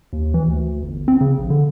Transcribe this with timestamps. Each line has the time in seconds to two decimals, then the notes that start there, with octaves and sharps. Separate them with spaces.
0.13 D#2
0.34 E3
0.48 D2
0.83 G1
1.08 C4
1.21 C#3
1.38 A#1
1.50 D3